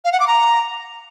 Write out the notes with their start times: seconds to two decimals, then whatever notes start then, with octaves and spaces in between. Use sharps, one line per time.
0.05 F5
0.12 F#5
0.20 D6
0.28 A#5